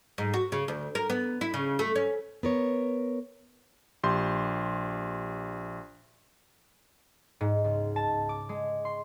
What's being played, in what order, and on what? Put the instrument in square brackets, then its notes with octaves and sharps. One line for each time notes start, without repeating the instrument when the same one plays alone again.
[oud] G#2
F#4
C#3
D2
A#4
B3
E4
C#3
A3
C#4
[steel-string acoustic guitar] B3 A#4 C#5
[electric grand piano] A#1 G4 C6 G6
[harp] G#2
C#2
A5
D6
G#3
C6